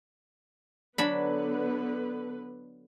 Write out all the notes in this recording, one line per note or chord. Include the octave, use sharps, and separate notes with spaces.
D3 F#3 B3 D4 B4 B5